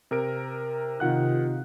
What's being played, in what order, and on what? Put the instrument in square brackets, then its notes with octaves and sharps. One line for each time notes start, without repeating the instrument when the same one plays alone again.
[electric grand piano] C3 A#4 D7
[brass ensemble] C3 D#4 F4 [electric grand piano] D#3 F#5 F#6